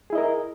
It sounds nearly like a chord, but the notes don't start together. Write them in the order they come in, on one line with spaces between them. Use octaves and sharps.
G#4 E4 D#5 A#4